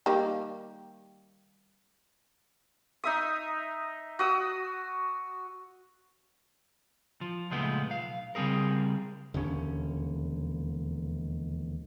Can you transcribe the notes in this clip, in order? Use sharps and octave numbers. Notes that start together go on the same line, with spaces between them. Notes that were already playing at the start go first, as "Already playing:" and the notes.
D#3 G3 A#3
D#4 E5 D#6
F#4 D#6 E6
F3
C#2 A#2 F3 G#3 A3 B3
B1 F5
C#3 G3 C4 G#4 A#4
E1 D#2 D3 C#4